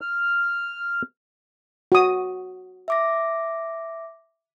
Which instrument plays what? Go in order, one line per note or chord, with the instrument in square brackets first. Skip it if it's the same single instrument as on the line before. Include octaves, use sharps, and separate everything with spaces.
[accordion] F6
[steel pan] F#4 D#6
[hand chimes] E5 D6 A#6